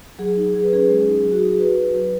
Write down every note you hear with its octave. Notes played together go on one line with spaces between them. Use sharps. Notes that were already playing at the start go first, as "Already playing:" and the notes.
F#3 G#4
D#4
F#3 G#4
B4
C#4 G#4
G#3
D#4
F#3
F#4
D#4 G#4
F#4 B4
F#4
F#3